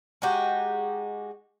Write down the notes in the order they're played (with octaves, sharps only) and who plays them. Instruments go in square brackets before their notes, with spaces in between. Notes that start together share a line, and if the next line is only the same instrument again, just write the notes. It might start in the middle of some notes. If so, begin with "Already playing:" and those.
[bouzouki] G#3 D#4 F#4 G4